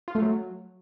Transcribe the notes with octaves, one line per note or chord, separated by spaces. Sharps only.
F4
A3
F#3